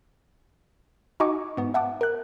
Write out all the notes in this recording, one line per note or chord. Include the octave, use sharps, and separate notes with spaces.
D#4 F#4 D#5 G#5 C#6 D6
G#2 B3
E5 F#5 A5 D6
A#4 F#6